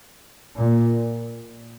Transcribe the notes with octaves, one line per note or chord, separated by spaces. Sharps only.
A#2